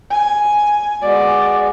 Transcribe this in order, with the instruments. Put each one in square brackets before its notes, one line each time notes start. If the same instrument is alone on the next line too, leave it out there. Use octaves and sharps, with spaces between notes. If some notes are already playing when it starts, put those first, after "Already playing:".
[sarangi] G#5
[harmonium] G#3 B3 F#4 [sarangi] D5